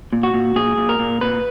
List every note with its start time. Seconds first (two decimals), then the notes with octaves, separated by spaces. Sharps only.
0.13 A#2
0.23 F#4
0.34 A#2
0.56 A#2 G#4
0.77 A#2
0.89 A#4
0.99 A#2
1.21 A#2 B4